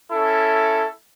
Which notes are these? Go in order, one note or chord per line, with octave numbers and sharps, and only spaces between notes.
C#4 E4 A4